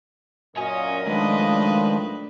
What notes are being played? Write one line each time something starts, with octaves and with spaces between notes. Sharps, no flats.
F#2 A#2 C#5 D#5 G#5
D#3 F3 G#3 A3 D4 B4